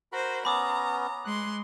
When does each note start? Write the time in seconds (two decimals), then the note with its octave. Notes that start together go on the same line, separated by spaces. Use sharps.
0.12 F#4 A#4 C5 B5
0.45 B3 C#4 A#5 B5 D6 D#6
1.25 G#3 C6 F#6